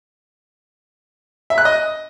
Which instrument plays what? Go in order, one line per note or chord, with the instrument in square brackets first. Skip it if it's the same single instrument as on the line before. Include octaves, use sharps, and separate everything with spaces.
[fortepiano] E5
F#6
D#5